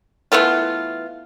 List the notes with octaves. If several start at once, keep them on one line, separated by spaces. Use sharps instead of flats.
E3 A3 B3 F4